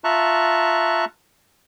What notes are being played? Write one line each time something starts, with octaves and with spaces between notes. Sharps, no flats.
F4 E5 A5 A#5 C#6 F#6